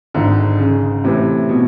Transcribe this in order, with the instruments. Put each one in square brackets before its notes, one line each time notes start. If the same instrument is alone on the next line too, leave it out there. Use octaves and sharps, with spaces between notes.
[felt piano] G#1 G#2 D#3 [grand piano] D3
[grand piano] C#3
[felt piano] A2 E3 A3 [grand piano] C3
[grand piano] B2